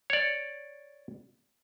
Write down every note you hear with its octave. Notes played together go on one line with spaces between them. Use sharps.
C#5 D5